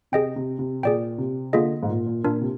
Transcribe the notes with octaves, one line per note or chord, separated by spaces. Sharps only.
C3 G#4 D#5 G5
C3
C3
A#2 G#4 D5 G5
C3
D3 A#3 F4 G#4 D#5
G#2
A#2
A#2
A#2 D4 F4 A#4
C3